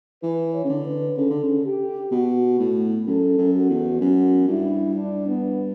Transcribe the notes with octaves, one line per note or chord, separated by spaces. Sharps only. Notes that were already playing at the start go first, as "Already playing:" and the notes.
E3 B4
C#5
C#3
D3
B4
C#3 A4
D3
C#3
G4
B2 F#4
A2
F#2 A4
F#2
F#4
E2
F#2 F#4
G2 E4
D4
B3